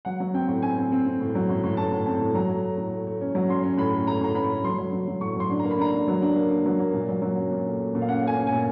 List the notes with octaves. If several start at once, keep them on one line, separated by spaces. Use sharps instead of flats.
F#3 F#5
F#3
C4 G5
A2
C4 G#5
C4
C4
C4
A2
F#3
A2
A2
A2 A5
A2
C4 A5
A2
F#3 A#5
A3
A3
A2
A3
A3
C#4
F#3
C#4 C6
C#4
A2 B5
A3
A3 A#5
A2 A#5
C#4 B5
A3
F#3 C6
F#3
F#3
F#3
A2 C#6
F#3 C6
D4
A#5
A#3
B5
D4 A#5
D4
F#3
D4
A#3
D4
F#3
A#3
A#2
F#3
F#3
C#4
A#2
A3
A3
A#2
F5
C#4 F#5
A3 G#5
C#4
G#5
A#2